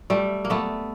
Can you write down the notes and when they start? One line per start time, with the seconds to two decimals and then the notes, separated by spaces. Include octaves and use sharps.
0.10 G3 A3
0.45 A#3
0.50 A3 B3